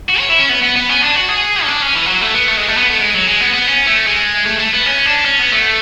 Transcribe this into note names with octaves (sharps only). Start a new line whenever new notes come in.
F#4
C#5
E4
C#4
B3
B3
B3
C#4
D4
F#4
G#4
C#4
D4
C#4
E3
F#3
A3
B3
A3
G#3
A3
B3
A3
G#3
F#3
G#3
B3
B3
C#4
A3
G#3
A3
A3
B3
C#4
D4
C#4
B3
A3